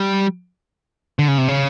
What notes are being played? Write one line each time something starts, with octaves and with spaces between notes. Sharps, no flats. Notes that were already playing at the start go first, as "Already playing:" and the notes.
Already playing: G3
D3
C#3
C3
C#3